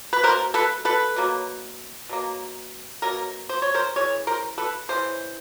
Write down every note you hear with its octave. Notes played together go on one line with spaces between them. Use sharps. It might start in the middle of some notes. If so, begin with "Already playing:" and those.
B4
B2 F#3 A#3 A#4 C5
A4 B4
A4 B4
B2 F#3 A#3
B2 F#3 A#3
B2 F#3 A#3 A#4
C5
C#5
A#4 C5
C#3 E3 G#3 C#5
A#4 C5
A4 B4
C#3 E3 G#3 C5